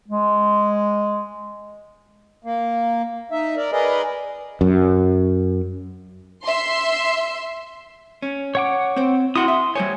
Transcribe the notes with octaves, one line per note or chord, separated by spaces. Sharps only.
G#3
A#3
D#4 E5
A#4 D5
G#4 A#4 B4 D5 D#5
F#2
E5 C6
C#4
C#5 F#5 D6
C4 C5
E4 F#4 F#5 C6 D#6
E5
G3 C5 C#5 G#5